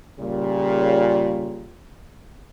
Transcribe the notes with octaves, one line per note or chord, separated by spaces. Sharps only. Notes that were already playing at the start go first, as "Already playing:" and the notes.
A#2 C#3 G3